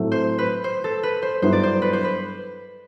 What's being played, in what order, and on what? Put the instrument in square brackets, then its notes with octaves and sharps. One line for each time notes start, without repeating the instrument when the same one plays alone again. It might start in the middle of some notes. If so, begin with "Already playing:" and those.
Already playing: [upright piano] A2 F#3 A3 C4
[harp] C5
B4
C5
A4
B4
C5
[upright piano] G2 F#3 B3 E4 [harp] C5
[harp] D5
C5
B4
C5
B4